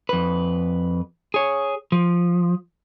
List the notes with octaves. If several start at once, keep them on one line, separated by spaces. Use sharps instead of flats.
F2 B4
G#4 C#5
F3